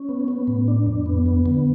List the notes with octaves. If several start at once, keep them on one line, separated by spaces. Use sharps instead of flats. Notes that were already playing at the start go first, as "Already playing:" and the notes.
Already playing: C#4
B3
B3
A2
D4
F2
B3
B3
D3